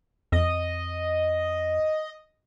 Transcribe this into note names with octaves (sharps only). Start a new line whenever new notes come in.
F2 D#5